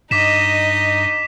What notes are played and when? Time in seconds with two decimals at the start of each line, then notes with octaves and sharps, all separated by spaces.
0.11 G2 D#4 D#5 D6 B6 E7